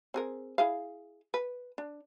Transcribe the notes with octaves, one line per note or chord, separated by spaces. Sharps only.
C4 G#4 A#4
E4 G#4 F5
B4
D4